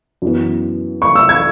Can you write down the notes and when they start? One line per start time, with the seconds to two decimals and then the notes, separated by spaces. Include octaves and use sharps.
0.22 F#2 E3 B3
1.02 C#6
1.15 E6
1.29 G#6